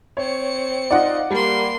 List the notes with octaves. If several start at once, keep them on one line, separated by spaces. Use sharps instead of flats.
C4 C#5 C#7
D#4 F4 D5 D#5 F#5
G3 A#3 C6